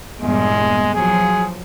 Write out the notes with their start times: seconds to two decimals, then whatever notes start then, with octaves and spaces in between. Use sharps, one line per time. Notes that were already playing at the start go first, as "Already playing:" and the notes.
0.21 E2 G2 A#2 G#3
0.94 F3 F#3 G#4